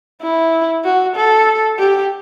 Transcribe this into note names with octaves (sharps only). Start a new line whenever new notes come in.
E4
F#4
A4
G4